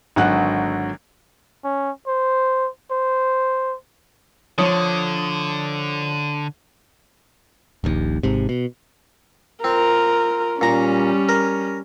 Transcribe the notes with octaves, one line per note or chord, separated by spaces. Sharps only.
G#1 D3 F#3 F#5 F#6
C#4
C5
C5
D3 F3 C#5 D#6
D#1 A#1 D#2
G#1 G#2 C3
B2
C4 F4 A#4
A#2 G3 C#4 A#5
A#4